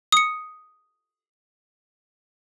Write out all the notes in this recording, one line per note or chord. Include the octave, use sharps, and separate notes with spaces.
D#6 C#7